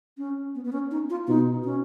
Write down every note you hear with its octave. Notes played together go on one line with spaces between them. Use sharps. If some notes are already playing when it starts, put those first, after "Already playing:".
C#4
B3
B3
C#4
D#4
F4
B2 D#4
C#4